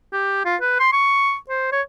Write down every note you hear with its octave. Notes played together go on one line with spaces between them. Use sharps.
G4
F4
B4
C6
C#6
C5
C#5